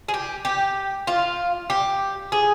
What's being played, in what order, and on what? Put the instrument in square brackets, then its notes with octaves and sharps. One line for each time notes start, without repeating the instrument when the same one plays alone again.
[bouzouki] G#4
G4
G4
F4
G4
G#4